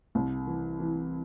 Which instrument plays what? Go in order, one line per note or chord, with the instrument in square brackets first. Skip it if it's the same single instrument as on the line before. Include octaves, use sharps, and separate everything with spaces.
[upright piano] C2
E3
E3